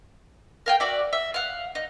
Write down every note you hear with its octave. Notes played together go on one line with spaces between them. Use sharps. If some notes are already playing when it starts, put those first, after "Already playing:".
A#4 F5 G5
F#4 D5 E5
E5
F5 F#5
D#4